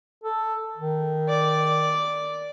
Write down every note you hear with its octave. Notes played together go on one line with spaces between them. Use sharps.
A4
D#3
D5